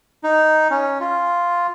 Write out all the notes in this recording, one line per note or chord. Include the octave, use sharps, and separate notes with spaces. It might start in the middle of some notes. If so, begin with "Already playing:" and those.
D#4
C#4
F4